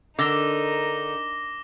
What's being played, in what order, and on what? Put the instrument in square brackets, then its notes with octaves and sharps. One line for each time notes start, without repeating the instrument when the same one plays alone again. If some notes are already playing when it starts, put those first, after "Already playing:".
[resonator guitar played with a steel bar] D3 [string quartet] D#4 A#4 [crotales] D6 A#6 G7